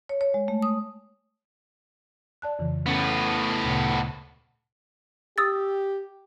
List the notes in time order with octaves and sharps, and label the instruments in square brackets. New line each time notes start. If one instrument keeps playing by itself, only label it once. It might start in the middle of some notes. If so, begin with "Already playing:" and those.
[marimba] C#5
C#5
G#3
A3
D#6
D5 A5 F#6
F2 C#3 E3
[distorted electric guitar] A2 B3 [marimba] C#4
[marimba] D2 A#2 C#3
[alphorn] G4 [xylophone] D#6 E6 A6